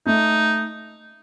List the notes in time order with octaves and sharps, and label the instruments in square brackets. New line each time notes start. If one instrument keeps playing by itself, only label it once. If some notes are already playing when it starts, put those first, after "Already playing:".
[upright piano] A3 [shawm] D#4